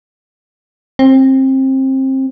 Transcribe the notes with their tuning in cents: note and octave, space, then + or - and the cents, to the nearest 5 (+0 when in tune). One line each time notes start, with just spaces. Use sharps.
C4 +25